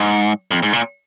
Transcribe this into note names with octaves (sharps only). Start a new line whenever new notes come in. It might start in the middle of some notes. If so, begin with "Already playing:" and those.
Already playing: G#2
F2
G#2
A#2